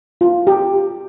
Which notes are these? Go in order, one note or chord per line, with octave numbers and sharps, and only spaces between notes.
F4
G4